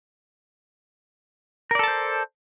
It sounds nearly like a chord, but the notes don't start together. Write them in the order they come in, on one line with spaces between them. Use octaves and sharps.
A#4 D5 A4 A5 C5